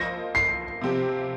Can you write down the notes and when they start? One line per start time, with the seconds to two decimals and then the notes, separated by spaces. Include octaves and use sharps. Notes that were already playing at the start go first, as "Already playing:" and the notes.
Already playing: F3 A#3 F4 C5 D#5 A#6
0.35 C7
0.81 C3 F3 C4 G4